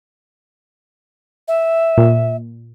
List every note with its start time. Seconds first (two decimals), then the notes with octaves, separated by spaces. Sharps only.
1.48 E5
1.97 A#2